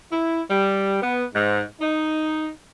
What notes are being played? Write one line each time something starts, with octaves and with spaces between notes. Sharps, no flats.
E4
G3
B3
G#2
D#4